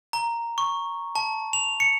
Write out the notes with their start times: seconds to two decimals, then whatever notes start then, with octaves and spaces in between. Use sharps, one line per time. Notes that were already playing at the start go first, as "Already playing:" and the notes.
0.13 A#5
0.58 C#6
1.15 A5
1.53 F7
1.80 C#7